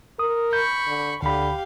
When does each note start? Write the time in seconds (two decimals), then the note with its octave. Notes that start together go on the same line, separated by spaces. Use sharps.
0.19 A#4 D#6
0.53 B5 C#6 G6
0.87 D3
1.22 D2 D3 G4 F5 B5